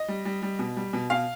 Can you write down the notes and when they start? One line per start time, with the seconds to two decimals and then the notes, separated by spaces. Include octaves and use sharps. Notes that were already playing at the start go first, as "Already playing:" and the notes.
Already playing: D#5
0.08 G3
0.25 G3
0.42 G3
0.59 B2
0.76 G3
0.93 B2
1.10 B2 F5